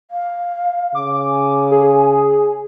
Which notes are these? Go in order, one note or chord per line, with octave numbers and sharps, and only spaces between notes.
F5
C#3 D6
G#5
G#4